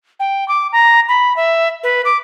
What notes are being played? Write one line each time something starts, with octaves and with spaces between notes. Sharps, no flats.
G5
D6
A#5
B5
E5
B4
D6